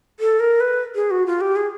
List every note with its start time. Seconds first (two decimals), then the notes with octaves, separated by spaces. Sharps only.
0.20 A4
0.40 A#4
0.60 B4
0.95 G#4
1.11 F#4
1.26 F4
1.41 G4
1.56 G#4